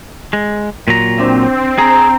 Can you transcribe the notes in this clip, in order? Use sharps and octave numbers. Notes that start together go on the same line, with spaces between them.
G#3
A#2 F#3 A#5
C4 D4 E5
G#4 A#5